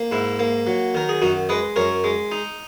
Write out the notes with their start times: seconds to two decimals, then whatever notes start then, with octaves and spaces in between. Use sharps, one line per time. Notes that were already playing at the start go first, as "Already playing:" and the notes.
Already playing: A#3
0.11 G#2 E4
0.39 A#3
0.67 F#3
0.94 D#3 A#4
1.09 G#4
1.22 F#2 D#4 F#4
1.49 G#3 B4 D#5
1.76 F#2 A#4 C#5
2.04 G#3
2.32 D#4